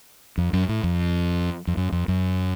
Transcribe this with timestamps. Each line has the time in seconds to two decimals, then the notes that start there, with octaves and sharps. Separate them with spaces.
0.38 F2
0.53 F#2
0.69 A2
0.83 F2
1.67 F2
1.77 F#2
1.92 F2
2.08 F#2